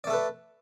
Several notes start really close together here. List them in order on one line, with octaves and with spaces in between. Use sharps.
D5 A3 A4 B4